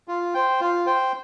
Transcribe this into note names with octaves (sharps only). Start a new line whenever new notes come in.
F4
C5 G5
F4
C5 G5